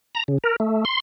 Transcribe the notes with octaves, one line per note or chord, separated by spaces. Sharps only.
A#5
C#3
A#4
A3
C6